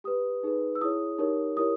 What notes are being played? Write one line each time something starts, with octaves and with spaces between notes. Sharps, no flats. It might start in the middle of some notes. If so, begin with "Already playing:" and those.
G4 B4 D#6
D#4 G#4 B4
E6
E4 G#4 C#5 D#6
D#4 G4 A#4 C#5
E4 G4 A#4 C#5 D#6